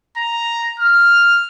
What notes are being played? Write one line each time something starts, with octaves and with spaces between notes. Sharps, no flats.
A#5
F6